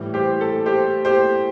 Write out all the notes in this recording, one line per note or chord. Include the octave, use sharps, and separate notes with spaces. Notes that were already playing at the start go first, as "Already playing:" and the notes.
Already playing: A2 E3 G3
G4 C5
A4
G4 C5
G4 C5